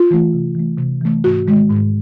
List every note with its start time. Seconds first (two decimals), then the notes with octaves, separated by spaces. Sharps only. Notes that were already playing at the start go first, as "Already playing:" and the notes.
Already playing: F4
0.11 E3 A3
0.33 C3
0.55 E3 A3
0.78 C3
1.01 E3 A3
1.24 G#2 F#4
1.47 D#3 G#3
1.70 G#2